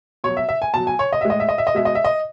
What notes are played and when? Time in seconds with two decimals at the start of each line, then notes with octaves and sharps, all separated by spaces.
0.24 B2 C#5
0.28 F#3
0.37 E5
0.49 E5
0.62 G#5
0.74 B2 F#3 A5
0.87 G#5
0.99 C#5
1.13 D#5
1.21 A2 G#3 E5
1.30 D#5
1.40 E5
1.49 D#5
1.58 E5
1.67 D#5
1.75 B2 G#3 E5
1.85 D#5
1.95 E5
2.05 D#5